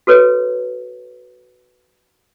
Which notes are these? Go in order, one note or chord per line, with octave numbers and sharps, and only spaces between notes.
F#4 A4 B4 C#5